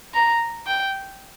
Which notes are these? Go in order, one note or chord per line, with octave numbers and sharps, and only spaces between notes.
A#5
G5